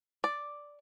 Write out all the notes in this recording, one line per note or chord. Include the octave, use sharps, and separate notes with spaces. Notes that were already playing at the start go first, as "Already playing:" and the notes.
D5